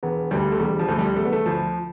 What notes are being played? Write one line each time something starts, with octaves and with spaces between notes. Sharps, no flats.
E1 B3
D2 D3 G3
A3
E1 G3
F3
D2 D3 A3
G3
E1 A3
B3
A3
D2 D3 F3